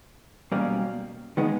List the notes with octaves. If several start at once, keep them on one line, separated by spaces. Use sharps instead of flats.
B1 B2 G3 A#3 C#4
D#3 G#3 B3 D#4